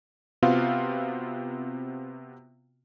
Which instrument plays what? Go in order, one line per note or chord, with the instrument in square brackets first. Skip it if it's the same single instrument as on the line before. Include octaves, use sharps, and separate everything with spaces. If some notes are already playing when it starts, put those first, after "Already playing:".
[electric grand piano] C3 B3 C4 F4 F#4 F5